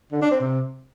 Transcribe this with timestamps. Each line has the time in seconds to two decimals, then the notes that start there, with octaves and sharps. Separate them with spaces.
0.12 D3
0.21 D4
0.31 C4
0.41 C3